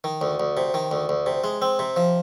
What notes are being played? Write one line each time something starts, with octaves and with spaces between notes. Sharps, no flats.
D#3
D2
D2
C3
D#3
D2
D2
C3
G#3
C4
C3
F3